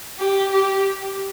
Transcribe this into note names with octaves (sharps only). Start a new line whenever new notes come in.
G4
G4